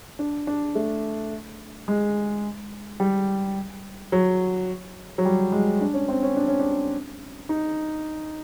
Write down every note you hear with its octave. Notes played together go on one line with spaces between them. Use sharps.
D4
D4
A3
G#3
G3
F#3
F#3
G3
G#3
D4
C#4
C4
C#4
D4
C#4
D4
D#4